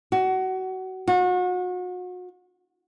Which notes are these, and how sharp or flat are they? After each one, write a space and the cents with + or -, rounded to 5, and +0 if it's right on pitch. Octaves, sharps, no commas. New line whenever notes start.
F#4 +25
F#4 -35